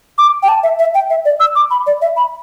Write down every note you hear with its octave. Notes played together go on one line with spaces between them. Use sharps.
D6
G5
A5
E5
E5
G5
E5
D5
E6
D6
B5
D5
E5
B5